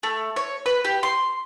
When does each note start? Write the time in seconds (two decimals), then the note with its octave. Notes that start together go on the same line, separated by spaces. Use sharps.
0.03 A3
0.36 C#5
0.66 B4
0.85 G4
1.03 C6